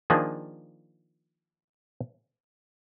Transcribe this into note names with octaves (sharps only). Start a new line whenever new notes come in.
D#3 F3 A#3 D4 G#4